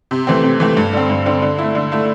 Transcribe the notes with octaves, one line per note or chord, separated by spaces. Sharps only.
C3
E3 A3 C4
C3
E3 A3 C4
G2
D3 C4
G2
D3 C4
D3
A3 E4
D3
A3 E4